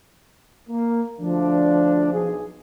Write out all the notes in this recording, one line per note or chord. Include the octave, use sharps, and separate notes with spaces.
A#3
D2 F3 D4
B1 G#4